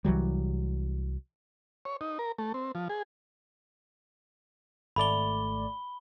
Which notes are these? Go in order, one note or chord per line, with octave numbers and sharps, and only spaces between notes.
C2 E3 F#3 G3
C#5
D#4
A#4
A3
C4
F3
G#4
G#1 A3 D5 B5 G7